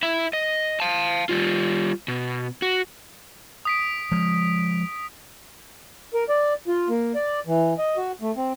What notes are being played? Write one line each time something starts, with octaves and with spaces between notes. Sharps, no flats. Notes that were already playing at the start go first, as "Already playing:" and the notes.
E4 E5
D#5
F5 A5
G3 F4
B2
F#4
D#6 B6 D7
F3 G#3
A#4
D5
F4
A#3
D5
E3
D#5
F#4
A3
C4